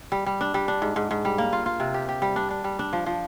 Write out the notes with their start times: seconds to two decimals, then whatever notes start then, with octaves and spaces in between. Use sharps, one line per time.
0.12 G3
0.26 G3
0.41 D4
0.54 G3
0.68 D4
0.82 G#2
0.96 G#2
1.11 G#2
1.25 G3
1.38 A#3
1.53 F4
1.66 F4
1.80 C3
1.94 G4
2.09 G4
2.22 G3
2.36 D4
2.51 D4
2.64 G3
2.79 D4
2.93 F3
3.06 F3